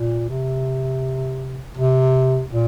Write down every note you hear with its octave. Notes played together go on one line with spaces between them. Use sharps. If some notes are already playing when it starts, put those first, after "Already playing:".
Already playing: A#2
C3
C3
A#2